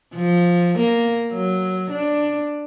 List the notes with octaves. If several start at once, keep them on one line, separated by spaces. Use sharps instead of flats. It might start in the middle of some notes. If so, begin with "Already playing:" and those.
F3
A#3
F#3
D4